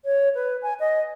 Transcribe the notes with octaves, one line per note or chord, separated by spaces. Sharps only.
C#5
B4
G#5
D#5